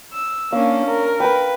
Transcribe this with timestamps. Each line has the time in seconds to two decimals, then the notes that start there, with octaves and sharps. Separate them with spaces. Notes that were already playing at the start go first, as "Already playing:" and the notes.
0.13 E6
0.53 A#3 C#4 D4 F5
0.86 A#4
1.20 B4 G5 B5